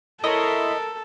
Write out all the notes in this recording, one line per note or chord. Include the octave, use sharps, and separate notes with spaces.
E4 A4 A#4 C#5 D#5 B5 C6